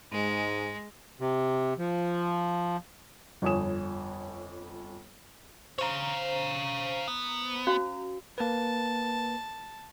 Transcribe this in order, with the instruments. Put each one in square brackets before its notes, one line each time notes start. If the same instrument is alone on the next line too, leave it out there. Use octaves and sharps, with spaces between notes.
[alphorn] G#2 [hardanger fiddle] G#3
[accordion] C3
F3
[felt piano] G1 F2 C#5 G#5 D#6 E7
[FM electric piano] C5 A#5 [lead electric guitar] C#5 F5
[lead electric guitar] B3
[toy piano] C#4 F#4 F5
[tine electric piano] A#3 B4 [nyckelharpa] A5